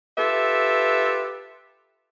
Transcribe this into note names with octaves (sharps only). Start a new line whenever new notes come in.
F4 G4 A4 B4 E5